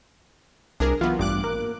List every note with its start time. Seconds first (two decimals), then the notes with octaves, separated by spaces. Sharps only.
0.80 C2 D4 G#4 A#4
1.01 E3 F#3 B3 F4
1.19 A1 G2 D6 F#6
1.44 A#3